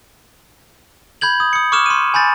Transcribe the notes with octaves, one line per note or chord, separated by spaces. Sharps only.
B5 G6 G#6 F#7
D#6
D#6 C#7
C#6 D6 F6 E7
C6 D#7
G#5 B5 G6 A6